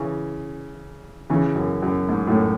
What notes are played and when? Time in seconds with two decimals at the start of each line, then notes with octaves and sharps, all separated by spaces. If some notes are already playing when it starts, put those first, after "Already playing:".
Already playing: C#3 E3
1.30 C#3 E3
1.55 F#2
1.82 F#2
2.09 G#2
2.27 F#2 A2